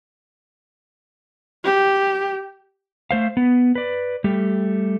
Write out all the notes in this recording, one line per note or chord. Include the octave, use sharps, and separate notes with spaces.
G4
A3 C5 F5
B3
B4 D5
G3 A3 G4